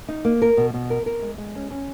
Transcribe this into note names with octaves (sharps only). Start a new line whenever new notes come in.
D#4
A#3
A#4
B2
B2
A#4
A#4
G#3
G#3
C#4
C#4